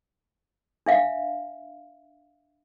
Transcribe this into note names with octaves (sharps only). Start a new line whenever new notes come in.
D4 E5 F5